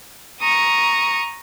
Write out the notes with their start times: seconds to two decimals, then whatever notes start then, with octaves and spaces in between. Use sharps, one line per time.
0.41 A#5 C#6 D#6